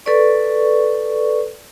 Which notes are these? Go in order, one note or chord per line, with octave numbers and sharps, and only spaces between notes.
A4 B4 D5 C#6